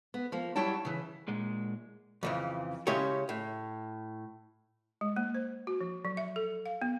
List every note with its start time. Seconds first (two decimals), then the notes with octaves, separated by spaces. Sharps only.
0.14 B3
0.32 F3 A#3
0.55 F#3 G3 E4 C#5 G5 A5
0.85 C#3 E3
1.28 A#2 G#3
2.23 F2 C#3 E3
2.87 C#3 G#3 C#4 E4 G4 C#5
3.29 A2
5.01 G#3
5.16 A#3
5.35 C5
5.67 F#4
5.81 F3
6.05 F#3
6.17 E5
6.36 A4
6.66 F5
6.82 B3